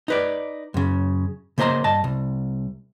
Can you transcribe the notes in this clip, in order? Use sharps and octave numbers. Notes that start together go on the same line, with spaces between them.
D#4 B4 D5
F#2 C#3
C#3 A#3 C5 D#5 A#5 C6
G2 D#5 A5
C2